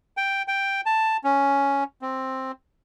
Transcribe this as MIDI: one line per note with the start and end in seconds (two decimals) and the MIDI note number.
0.17 0.42 79
0.48 0.81 79
0.86 1.17 81
1.24 1.84 61
2.02 2.52 60